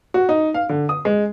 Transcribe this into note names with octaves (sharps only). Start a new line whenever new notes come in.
F#4
D#4
F5
D3
D#6
G#3